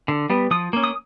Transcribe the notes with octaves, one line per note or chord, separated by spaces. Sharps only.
D3
G3 B3
F3 D#6
A#3 C#4
D#6